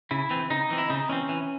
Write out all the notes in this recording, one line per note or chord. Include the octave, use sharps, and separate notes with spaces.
C#3 E4
E3 C4
C#3 D#4
E3 C4
E4
C#3 D#4
E3 C4 C#4
E3